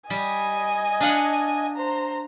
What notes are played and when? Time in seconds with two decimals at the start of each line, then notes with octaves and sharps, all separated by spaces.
0.10 G3 D#5 G#5
1.00 D4 F5 F#5
1.76 C5 A#5